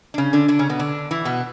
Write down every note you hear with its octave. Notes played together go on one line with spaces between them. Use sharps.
D4
C#3 C#4
D3 D4
D3 D4
C#3 C#4
B2 B3
D3 D4
E3 E4
B2 B3